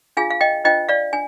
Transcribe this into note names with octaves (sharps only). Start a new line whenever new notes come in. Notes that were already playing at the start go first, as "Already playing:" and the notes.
D4 F4 G#4 F5 G#5
F5
D#5 G5
D4 F4 C5 D#5 G5
D5 F5
D4 G#5